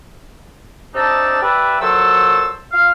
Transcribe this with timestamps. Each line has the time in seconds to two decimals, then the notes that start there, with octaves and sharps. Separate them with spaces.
0.95 C3 D4 D#4 A5 E6
1.42 G4 B4 D5 E5
1.81 A#2 F#3 A4 C5 E6
2.72 F4 F5